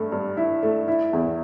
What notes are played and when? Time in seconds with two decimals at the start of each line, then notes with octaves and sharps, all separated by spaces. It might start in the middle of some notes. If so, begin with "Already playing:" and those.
Already playing: G2 A3
0.12 G2
0.37 E4
0.63 A3
0.88 E4
1.13 E2